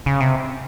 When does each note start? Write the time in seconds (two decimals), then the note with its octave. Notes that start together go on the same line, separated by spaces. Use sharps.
0.06 C#3
0.20 C3